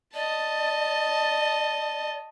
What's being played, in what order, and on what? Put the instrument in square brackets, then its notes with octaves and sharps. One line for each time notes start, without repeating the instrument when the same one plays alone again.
[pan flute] D5 [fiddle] D#5 A5